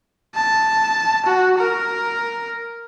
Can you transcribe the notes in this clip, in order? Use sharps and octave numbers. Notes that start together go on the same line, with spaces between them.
A5
F#4
A#4